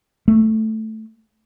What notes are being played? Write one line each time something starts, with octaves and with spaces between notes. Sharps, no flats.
A3